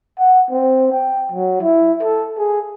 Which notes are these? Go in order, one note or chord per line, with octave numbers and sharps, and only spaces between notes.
F#5
C4
G5
F#3
E4
A4
G#4